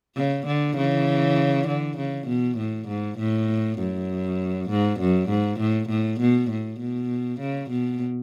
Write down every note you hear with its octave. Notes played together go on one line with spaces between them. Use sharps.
C#3
D3
C#3 E3
D3
C#3
B2
A2
G#2
A2
F#2
G#2
F#2
G#2
A2
A2
B2
A2
B2
C#3
B2